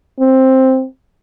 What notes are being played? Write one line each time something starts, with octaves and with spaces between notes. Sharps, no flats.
C4